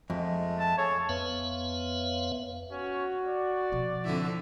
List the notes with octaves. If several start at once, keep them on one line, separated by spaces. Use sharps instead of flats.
F2 G#3 A3
A5
G#4 A4 C#5
F2 B3 B4 C#5 E5 F5
C#4 F#4
D5
B2 F3
F2 D3 E4